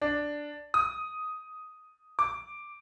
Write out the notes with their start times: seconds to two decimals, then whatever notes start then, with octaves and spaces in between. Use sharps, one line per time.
0.02 D4
0.74 D#6
2.19 D6